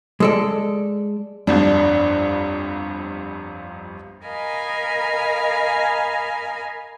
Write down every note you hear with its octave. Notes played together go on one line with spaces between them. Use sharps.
G#3 A4 D5
G1 C2 F2 D4
A#4 D#5 F5 G#5 B5